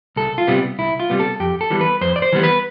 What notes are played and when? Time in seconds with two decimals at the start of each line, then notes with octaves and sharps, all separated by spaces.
0.16 C2 A4
0.38 F4
0.47 C3 G3 B3
0.79 C2 E4
1.00 F4
1.10 C3 G3 B3
1.20 A4
1.40 F2 G4
1.61 A4
1.70 E3 G3 B3
1.81 B4
2.01 F2 C5
2.16 D5
2.22 C5
2.32 E3 G3 B3
2.43 B4